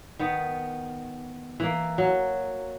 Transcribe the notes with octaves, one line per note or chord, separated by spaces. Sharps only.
D#3 B3
E3 A#3
F#3